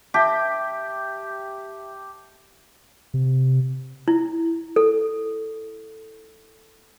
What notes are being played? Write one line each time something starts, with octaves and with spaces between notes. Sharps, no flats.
G4 E5 A5
C3
E4
A4